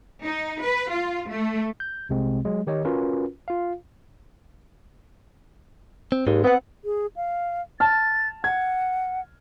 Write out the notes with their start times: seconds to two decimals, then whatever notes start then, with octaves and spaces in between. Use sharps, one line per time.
0.24 D#4
0.61 B4
0.90 F4
1.28 A3
1.80 G6
2.09 C2 C3 G#3 C4
2.45 F#3 G#3
2.67 D#3 G4 C#5 D#5
2.85 C#4 F4 F#4 A#4 B4
3.48 F4 F5
6.12 C4
6.27 D#2 G#2 G#3
6.44 B3 C4 F#5
6.84 G#4
7.16 F5
7.80 A5 F6 A6
8.44 F#5 G#6